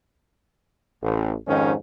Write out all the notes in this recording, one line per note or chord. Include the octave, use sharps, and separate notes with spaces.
A1
F2 G#2 D#3 C#4